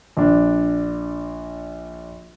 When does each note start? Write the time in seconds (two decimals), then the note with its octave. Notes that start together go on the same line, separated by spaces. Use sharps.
0.17 A#1 D4